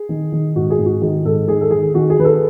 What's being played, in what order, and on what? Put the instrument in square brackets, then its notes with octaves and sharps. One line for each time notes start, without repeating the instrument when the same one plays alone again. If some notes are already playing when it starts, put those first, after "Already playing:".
Already playing: [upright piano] G#4
D#3
D#3
G#2 F#4
G#4
G#2
F#4
D#3 G#4
G#2 A4
D#3 G#4
A4
D#3 G#4
D#3 F#4
G#4
D#3 B4
A4